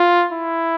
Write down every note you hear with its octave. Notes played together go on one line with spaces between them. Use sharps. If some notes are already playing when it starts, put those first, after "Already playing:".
Already playing: F4
E4